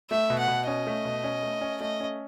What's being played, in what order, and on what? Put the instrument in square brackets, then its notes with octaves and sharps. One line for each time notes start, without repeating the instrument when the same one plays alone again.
[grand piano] A3 [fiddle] E5
[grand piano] B2
[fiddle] F#5
[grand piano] B2
[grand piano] C#4 [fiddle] D#5
[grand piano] A3
B2
C#4
A3
C#4
[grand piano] A3 [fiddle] D#5
[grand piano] C#4